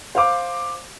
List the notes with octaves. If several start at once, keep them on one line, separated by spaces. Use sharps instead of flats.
C5 F5 D6